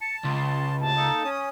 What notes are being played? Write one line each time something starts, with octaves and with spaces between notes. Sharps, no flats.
A5 C#7
C#2 C6
A2 C3 A5
A#3 D#4 A4
C#4 D#6